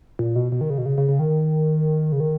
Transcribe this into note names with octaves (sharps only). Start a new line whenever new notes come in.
A#2
B2
B2
D#3
C#3
B2
C#3
C#3
C#3
D#3
C#3
D#3